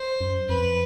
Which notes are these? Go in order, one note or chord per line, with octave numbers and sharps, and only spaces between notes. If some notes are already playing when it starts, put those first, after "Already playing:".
Already playing: C5
F#2
F2 B4